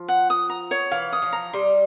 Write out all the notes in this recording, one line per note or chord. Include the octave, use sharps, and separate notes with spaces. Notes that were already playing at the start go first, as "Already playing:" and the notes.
Already playing: F3
F#5
D#6
A#5
C#5
E3 F5
D#6
F3
A#5
G3 C6